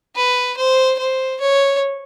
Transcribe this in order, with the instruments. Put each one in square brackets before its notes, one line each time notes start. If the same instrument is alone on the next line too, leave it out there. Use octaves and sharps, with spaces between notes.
[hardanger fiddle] B4
C5
C5
C#5